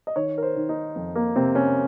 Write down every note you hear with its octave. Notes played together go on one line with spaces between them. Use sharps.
D#5
D#3 C#5
A#4
C5
D#3
D#4
F2
A#3
C3 C4
C#4